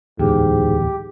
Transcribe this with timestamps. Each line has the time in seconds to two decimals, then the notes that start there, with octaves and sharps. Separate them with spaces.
0.19 D1 E2 G#2 G4